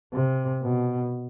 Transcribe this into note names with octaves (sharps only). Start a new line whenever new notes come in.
C3
B2